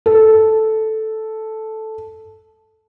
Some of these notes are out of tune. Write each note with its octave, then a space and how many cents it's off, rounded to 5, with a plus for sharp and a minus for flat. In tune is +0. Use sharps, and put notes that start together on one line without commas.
A4 -5